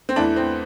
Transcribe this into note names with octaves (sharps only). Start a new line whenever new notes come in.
C4
E2 E3 A3 D4
C4